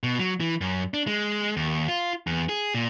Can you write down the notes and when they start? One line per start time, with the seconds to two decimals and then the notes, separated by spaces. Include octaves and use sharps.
0.03 B2
0.19 F#3
0.40 E3
0.61 F#2
0.94 D4
1.07 G#3
1.57 D#2
1.89 F4
2.27 E2
2.49 G#4
2.74 A#2